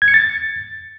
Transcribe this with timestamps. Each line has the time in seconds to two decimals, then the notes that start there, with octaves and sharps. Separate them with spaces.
0.02 G#6
0.08 C#7
0.14 A6